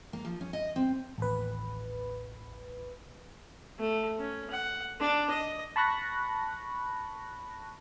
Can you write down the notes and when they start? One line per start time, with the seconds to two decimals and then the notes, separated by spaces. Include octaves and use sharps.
0.13 A#3
0.25 F3
0.41 C#4
0.53 D#5
0.76 C4
1.18 A1 D#2 B4
3.79 A3
4.19 C#4
4.50 F#5
5.00 D4
5.30 D#5
5.76 A5 B5 C#6 F#6 A#6